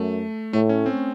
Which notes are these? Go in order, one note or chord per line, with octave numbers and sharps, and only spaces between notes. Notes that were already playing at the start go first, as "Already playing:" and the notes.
Already playing: F#2 A3
A2 A3
C#4
C4